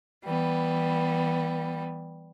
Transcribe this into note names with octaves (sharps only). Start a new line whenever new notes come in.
E3 G3 B3